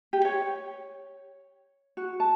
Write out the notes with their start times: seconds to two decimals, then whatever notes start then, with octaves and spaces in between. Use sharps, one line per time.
0.13 G4
0.25 C#5
1.97 F#4
2.20 A5